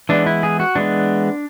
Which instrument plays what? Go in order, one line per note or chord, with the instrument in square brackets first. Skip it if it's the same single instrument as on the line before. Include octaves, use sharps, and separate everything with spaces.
[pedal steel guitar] E3 G#3 B3 D4
E4
G#4
F#4
E3 G#3 B3 D4